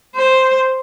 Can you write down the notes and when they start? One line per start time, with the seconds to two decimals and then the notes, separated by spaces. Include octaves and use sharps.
0.16 C5